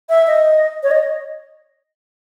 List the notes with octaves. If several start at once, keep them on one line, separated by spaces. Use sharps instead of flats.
E5
D#5
C#5
D#5